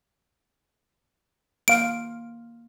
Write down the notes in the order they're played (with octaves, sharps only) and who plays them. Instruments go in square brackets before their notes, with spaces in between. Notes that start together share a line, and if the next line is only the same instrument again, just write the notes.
[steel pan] A#3 F5 [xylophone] D7